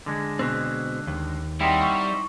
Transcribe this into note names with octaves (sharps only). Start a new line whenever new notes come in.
D3 G#3
B2 C4 E6 F#6
D#2
G3 C4 D#4 E4 F#5 G5
C#6